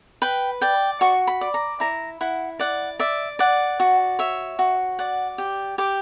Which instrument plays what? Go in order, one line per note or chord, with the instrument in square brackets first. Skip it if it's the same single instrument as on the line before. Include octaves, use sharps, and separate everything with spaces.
[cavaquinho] B4 G5
D5 G5
F#4 C#6
B5
D5
A#5
E4 A#5
E4 F#5
D5 F#5
D5 E5
D5 F#5
F#4
C#5 E5
F#4
D5 F#5
G4
G4 D6